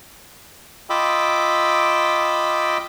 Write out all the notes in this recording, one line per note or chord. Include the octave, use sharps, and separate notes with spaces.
F4 D#5 G5 B5 D6 E6